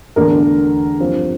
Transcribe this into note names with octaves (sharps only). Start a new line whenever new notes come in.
E2 D3 A3 D4 A#4
G2 F3 C4